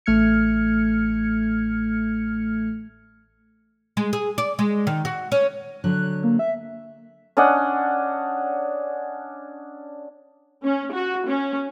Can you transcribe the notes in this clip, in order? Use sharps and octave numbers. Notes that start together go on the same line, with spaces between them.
A1 A3 F6 G#6 C#7
G#3
G#4
D5
G#3
D#3
F#4
C#4
D3 F#3 C#5 F#6
A#3
E5
C#4 D4 D#5 F#5
C#4
F#4
C#4